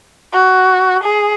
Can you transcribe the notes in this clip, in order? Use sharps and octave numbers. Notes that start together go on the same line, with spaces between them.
F#4
G#4